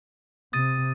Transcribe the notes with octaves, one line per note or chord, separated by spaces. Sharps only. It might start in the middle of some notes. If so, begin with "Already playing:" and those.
C3 D#6 A6 D#7